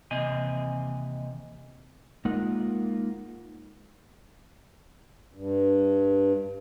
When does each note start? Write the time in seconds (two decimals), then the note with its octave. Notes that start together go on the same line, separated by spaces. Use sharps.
0.11 D#2 C3 E3 C4 D#5 G#5
2.25 G#3 A#3 D#4 F4 A#4 F#5
5.34 G2